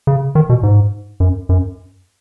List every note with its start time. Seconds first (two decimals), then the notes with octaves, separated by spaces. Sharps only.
0.07 C#3
0.35 D#3
0.50 B2
0.63 G#2
1.20 F#2
1.49 F#2